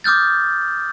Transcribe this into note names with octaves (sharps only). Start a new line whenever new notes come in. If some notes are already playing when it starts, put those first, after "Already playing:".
D6 D#6 F6 G6 A6